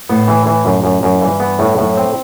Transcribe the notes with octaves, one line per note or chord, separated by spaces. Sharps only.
A2 B3
E3
E3
F#2
F#2
F#2
G2 E3
B3
A2
F#2 A2
C4